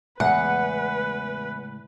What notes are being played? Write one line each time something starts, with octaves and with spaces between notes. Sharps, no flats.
E2 A2 C#3 G#3 B4 F#5